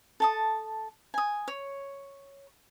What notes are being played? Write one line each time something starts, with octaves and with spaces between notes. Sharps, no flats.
A4 A5 D#6
G#5 D#6
C#5